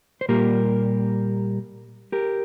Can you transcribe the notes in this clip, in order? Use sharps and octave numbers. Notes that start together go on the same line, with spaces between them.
C5
A#2 G3 A#3 G4 A#4
G4 A#4